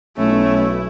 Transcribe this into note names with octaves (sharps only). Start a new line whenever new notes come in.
B1 A3 C#4 E4